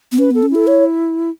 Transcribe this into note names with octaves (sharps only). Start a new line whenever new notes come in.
B3
C#4 B4
B3 A4
C#4
E4 A4
C#5